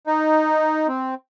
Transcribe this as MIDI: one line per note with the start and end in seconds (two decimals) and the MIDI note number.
0.07 0.87 63
0.88 1.15 60